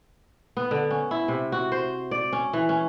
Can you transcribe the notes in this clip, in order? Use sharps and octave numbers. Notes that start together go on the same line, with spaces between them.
B3
D3
C#4
E4
C3
F#4
C5
D5
C#4
E3
C#4